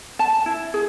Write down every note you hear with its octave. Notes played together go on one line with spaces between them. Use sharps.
A5
E4
G#4